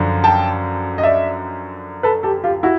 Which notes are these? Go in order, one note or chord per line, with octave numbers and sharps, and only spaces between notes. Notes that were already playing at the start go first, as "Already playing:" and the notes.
Already playing: F#2 D3 F3
G5 A5
D#5
D5 E5
A4 B4
G4 A4
F4 G4
E4 F#4